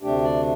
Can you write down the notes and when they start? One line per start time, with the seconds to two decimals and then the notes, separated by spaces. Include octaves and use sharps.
0.03 D2 C3 A3 D4 G4
0.24 D5